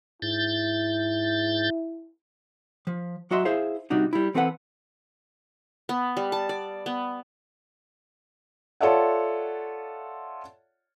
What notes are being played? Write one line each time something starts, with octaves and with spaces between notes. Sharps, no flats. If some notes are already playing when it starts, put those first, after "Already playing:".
G#2 E4 G6 A6
F3
F#3 F#4 D#5 E5 C6
E4 G#4 C5 E5 F5
C3 G3 D4 D#4 F#4
G3 E4
E3 C4 A4 B4 F#5
B3
G3
A5
D5
B3
F4 A4 C#5 D5 E5 F#5